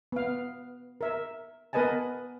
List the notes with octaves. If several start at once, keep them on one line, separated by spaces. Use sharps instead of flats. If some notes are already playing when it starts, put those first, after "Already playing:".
B3 F5
A#4 E5
B3 A#4 B4 D#5 G#5 A5